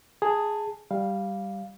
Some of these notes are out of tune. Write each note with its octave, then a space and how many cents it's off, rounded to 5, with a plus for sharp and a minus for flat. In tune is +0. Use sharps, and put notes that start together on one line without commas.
G#4 +0 A5 +15
G3 +0 F5 +0